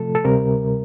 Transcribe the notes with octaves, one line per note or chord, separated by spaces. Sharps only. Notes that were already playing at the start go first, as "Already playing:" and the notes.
Already playing: C3 F3 A3 A4
A4
D2 C3 G3 A#4